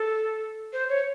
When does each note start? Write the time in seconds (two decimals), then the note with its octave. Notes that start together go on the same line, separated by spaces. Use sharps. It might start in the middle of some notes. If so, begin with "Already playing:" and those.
Already playing: A4
0.73 C5
0.89 C#5